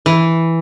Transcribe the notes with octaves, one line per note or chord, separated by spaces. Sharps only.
E3